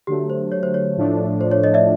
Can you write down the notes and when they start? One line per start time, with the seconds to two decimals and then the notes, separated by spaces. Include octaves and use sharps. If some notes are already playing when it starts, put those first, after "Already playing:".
0.07 D3 F#3 A3 G4
0.30 C5
0.52 C#5
0.63 C5
0.74 C#5
0.97 A2 F3 A3 D4
1.41 C5
1.51 C#5
1.64 C#5 D#5
1.74 D5 E5